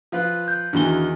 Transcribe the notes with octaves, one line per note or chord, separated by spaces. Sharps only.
F3 F4 B4
G6
E2 D#3 E3 D4 F#4 G7